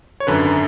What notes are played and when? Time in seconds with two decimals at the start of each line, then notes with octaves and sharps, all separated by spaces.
0.20 C#5
0.27 G#1 F#2 D3 B4